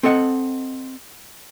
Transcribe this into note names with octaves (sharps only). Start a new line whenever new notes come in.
C4 A4 D#5 F#5